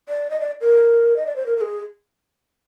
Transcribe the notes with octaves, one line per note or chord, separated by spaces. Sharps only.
D5
D#5
D5
A#4
D#5
D5
C5
A#4
A#4
G#4